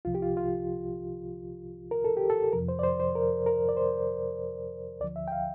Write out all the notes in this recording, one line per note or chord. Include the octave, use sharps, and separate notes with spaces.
C2 C3 F3 F4
G4
F4
F4
A#4
A4
G4
A4
F2 C3 F3 A#4
C5
D5
C5
C5
A#4
A#4
D5
C5
D2 D3 F3 D5
E5
G5
F5